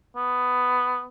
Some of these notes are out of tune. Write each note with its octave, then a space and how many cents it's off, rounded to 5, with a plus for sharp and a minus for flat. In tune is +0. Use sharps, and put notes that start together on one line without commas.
B3 +10